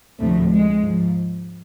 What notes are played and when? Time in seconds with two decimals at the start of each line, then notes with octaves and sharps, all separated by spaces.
0.19 D2 A2 C3 F3 A3
0.51 G#3
0.82 G#2 F3